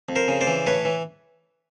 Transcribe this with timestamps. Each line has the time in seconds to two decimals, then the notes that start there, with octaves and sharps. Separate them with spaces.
0.09 F2
0.16 A#4 C5
0.28 C#3
0.41 C5 D5
0.47 E3
0.67 A2 B4 C#5
0.85 E3